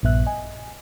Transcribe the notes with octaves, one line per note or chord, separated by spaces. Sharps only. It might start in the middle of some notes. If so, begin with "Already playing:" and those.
A#1 G2 B3 E5 F#6
D#5 G#5